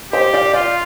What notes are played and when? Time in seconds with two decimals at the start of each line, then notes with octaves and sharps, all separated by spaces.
0.13 G4 C5 D#5
0.34 D5 F5
0.53 F4 D5 F5